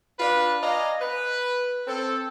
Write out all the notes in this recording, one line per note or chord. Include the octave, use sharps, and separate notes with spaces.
D4 F4 B4
D5 D#5 F5 G#5 A#5
B4
C4 A4